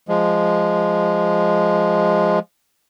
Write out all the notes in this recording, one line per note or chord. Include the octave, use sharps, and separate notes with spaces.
F3 G#3